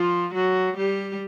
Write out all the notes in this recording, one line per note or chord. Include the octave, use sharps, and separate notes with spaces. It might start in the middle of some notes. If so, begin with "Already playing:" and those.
Already playing: F3 F4
F#3 F#4
G3 G4